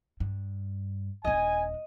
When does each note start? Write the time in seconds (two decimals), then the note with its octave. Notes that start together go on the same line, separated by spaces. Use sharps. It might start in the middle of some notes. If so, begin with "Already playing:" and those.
0.20 G2
1.25 D#1 D4 D#5 G#5